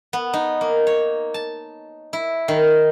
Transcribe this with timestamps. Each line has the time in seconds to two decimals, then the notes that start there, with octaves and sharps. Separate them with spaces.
0.13 B3
0.33 D#4
0.61 A#3
0.87 C#5
1.34 A5
2.13 E4
2.48 D#3